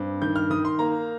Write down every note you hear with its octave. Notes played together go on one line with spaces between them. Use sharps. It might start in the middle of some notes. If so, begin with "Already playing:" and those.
Already playing: G2 C4
D#3 G6
F6
D#3 D#6
C6
A#3 A#5